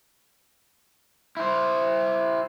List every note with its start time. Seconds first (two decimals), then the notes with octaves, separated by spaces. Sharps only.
1.37 E4 C5